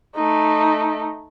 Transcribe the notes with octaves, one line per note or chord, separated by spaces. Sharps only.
A3 D#4